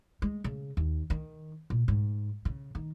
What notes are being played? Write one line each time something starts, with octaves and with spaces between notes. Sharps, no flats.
G#3
C#3
D#2
D#3
A#2
G#2
C#3
D#3